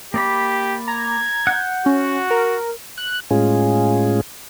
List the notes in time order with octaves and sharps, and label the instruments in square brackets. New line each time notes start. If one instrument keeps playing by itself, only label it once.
[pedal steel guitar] A#3 D5 B5 [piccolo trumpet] G4
[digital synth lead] A#5 [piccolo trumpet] G#6
[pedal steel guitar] F#5 G6
[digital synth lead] C#4 [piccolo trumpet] F#4
[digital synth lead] A#4
[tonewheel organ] F#6
A2 G#3 C#4 F4 G#4